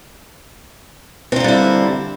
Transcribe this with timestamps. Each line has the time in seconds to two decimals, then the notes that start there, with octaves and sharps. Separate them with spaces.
1.32 C4
1.36 D3
1.40 A#3
1.44 G3
1.48 E4